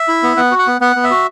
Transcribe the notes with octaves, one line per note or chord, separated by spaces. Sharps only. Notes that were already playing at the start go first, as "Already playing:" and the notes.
Already playing: E5
E4
B3
B3 F#5
F#4
F#5
B3
B3 F#5
B3
E5
F#4